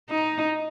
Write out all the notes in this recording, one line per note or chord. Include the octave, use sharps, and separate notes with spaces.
D#4